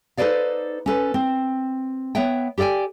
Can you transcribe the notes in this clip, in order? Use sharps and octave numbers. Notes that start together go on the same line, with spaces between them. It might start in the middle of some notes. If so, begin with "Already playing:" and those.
D#4 A4 B4 C5 D5 F5
C#4 A4 B4
C4
B3 C#5 E5 F#5 G5
G4 A4 D5 G5 G#5